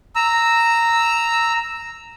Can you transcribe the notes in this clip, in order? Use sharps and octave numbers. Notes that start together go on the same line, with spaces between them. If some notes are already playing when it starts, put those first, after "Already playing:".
A#5 E6